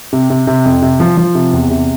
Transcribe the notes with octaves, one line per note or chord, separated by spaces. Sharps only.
C3
C3
C3
F2
C3
F3
F3
C3
E2
C3